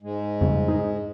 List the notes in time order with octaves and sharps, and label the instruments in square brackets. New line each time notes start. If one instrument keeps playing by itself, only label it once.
[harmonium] G#2 G#3
[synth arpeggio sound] F2 C#3 G3
D#4 G#4